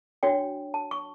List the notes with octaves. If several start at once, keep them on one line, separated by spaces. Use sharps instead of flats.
D4 F#4 C#5 G5
A5
C#6